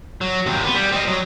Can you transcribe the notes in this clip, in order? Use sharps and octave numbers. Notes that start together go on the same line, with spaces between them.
F#3
D#2 C3
B3
G3
C4 D#5
F#3